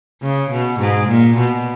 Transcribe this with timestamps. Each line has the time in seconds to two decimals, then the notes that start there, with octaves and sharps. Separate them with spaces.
0.22 C#3
0.51 B2
0.80 G#2
1.09 A#2
1.37 B2